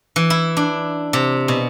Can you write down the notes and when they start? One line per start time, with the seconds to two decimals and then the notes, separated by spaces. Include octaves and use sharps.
0.16 E3
0.30 E4
0.57 D4
1.13 C3
1.48 B2